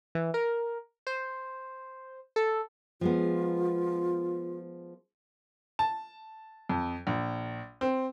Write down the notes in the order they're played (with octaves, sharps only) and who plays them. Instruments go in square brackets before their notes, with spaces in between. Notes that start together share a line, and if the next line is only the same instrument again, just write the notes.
[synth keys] E3
A#4
C5
A4
[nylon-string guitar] F3 G#3 B3 [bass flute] F4
[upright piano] A5
F2
A#1
C4